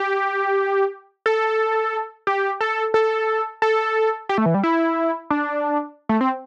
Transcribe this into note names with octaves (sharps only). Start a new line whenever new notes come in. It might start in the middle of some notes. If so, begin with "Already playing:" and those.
Already playing: G4
A4
G4
A4
A4
A4
G4
A3
E3
G3
E4
D4
A3
C4